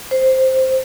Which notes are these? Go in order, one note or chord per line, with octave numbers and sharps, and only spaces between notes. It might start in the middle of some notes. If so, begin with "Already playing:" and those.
C5